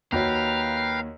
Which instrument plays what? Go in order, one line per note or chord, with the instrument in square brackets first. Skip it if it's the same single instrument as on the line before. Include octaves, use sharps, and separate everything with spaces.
[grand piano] D#2 F#4 C#5 [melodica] B4 G5 A#5 [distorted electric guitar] F5